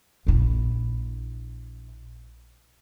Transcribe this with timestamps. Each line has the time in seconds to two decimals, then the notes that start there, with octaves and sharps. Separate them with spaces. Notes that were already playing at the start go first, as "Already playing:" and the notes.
0.27 A#1 E4